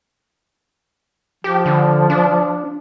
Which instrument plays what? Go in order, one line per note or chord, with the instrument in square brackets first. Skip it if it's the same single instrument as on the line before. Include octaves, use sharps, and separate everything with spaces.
[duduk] F3 [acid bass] G4
[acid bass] D3
D4